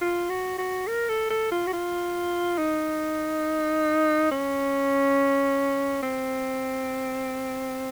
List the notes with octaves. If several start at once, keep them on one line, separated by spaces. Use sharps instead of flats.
F4
F#4
F#4
A#4
A4
A4
F4
F#4
F4
D#4
C#4
C4